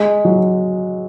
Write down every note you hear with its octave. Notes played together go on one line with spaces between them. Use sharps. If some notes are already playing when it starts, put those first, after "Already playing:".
Already playing: G#3
F#3